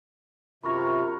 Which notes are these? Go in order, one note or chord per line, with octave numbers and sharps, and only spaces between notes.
F#2 C3 F4 A#4 C#5 B5 C#6 A#6